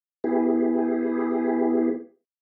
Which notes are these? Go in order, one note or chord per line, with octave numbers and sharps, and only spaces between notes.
B3 E4 G4 G#4